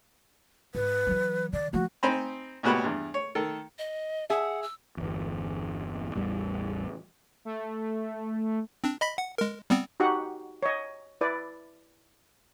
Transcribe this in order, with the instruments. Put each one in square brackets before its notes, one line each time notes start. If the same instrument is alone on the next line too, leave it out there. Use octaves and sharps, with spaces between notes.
[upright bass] G#2 [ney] B4
[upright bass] E3 F#3
[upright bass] D#3 [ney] D5
[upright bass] F3 A3 [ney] F#4
[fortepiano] C4 D#4 C5 G#5 A#5 B5
C#2 A#2 B3 F#4 G4 B5
E2 G2
C#5
D#3 A4
[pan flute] D#5
[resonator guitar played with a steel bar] G#4 E5 [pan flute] F#5
[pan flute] E6
[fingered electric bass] G1 E2
A1 E2 G3
[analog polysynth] A3
[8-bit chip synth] C4 D4
D#5 B5 B6
F#5
G#3 A#4
G3 B3 C4
[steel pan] D#4 F#4 G4 F#5
C#5 D#5
E4 B4 D5